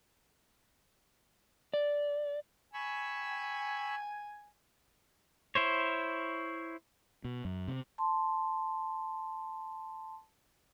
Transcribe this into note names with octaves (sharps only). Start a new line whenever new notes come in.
D5
G#5 B5 C#6 E6
E4 C5 C#5
B2
F#2
C3
A5 C6